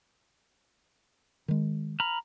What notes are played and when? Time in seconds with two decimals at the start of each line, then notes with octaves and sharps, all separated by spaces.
1.48 D#3 G#3
2.00 A#5 B5 F6